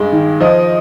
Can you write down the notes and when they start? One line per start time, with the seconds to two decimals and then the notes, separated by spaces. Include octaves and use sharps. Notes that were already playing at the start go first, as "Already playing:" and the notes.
Already playing: G2 G#3
0.12 D#3
0.40 F3 D#5